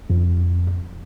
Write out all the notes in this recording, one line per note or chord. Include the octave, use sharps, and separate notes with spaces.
F2